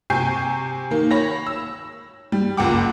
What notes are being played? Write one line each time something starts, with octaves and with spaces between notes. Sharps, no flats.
C3 G4 G#5 C#6 G6 C7
D#3 A#3
C#5 B5 A#6
E6
G3
F#1 C#2 F4 F#5 G5 D6